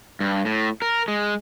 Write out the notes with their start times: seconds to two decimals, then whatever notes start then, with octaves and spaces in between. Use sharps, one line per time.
0.20 G2
0.45 A2
0.82 A#4
1.08 G#3